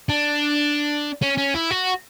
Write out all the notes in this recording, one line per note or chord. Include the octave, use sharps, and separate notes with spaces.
D4
C#4
C#4
E4
F#4